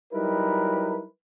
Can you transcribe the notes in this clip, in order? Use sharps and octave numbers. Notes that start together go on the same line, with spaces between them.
F#3 G3 D#4 E4 A#4 B4